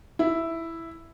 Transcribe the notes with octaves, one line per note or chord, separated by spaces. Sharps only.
E4